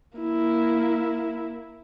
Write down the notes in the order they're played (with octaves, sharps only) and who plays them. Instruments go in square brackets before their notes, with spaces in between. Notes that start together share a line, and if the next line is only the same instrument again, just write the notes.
[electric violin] A#3 E4